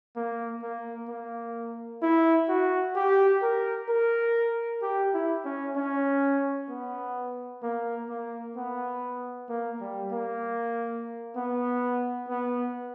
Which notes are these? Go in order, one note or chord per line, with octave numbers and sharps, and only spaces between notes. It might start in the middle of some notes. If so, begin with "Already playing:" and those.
A#3
A#3
A#3
E4
F#4
G4
A#4
A#4
G4
E4
C#4
C#4
B3
A#3
A#3
B3
A#3
G3
A#3
B3
B3